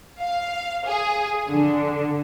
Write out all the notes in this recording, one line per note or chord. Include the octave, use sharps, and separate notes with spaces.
F5
G#4
D3